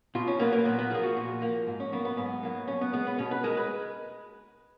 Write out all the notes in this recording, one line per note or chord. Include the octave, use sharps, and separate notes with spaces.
B2 F4
C#4
F#3 A#3 B3
A#3
A#2 B3
B3
F3 A#3 G#4
F#4
A#2
F3 A#3
G#2
C#4
F#3 A#3 B3
B3
G#2 B3
F#3 A#3
B2 C#4
B3
G#3 B3
B3
B2 C#4
B4
G#3 A#4
B4